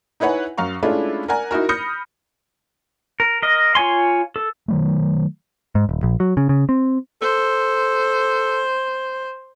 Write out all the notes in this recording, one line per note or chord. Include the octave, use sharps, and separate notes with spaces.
D#4 E4 B4 C#5 F#5 G#5
F#2 F5 A#5 C#6
G#3 A3 C#4 D4 E4 F4
A#4 D5 F#5 G#5 A#5
D#4 E4 F#4 A#4
B5 D#6 F6 G6 A#6 C#7
A#4
A#4 D#5
F4 C#5 G#5 C6
A4
D#3 F#3 A3
G#2
D#1
A#1
F#3
C#3
C#3
C4
A4 C5